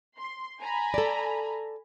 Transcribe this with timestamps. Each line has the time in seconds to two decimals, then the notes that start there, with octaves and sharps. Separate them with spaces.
0.18 C6
0.60 G#5 A#5 B5
0.94 A4 D5